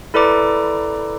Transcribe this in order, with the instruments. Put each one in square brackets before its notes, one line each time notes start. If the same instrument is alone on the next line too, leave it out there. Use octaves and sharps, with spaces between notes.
[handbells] E4 A4 B4 D5 A#5 D6